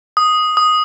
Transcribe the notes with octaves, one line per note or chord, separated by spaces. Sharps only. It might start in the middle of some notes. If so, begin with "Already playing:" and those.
D#6
D#6